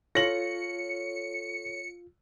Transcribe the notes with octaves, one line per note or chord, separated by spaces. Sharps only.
F4 A4 C#5 A#6 C#7 F#7